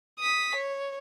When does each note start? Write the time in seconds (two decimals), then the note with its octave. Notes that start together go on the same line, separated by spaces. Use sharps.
0.20 D#6 B6
0.55 C#5